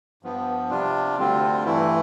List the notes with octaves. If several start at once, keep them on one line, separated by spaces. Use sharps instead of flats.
G2 F3 B3
C3 G3 D4 F4
D2 D3 G3 C4 F4
G2 E3 A3 E4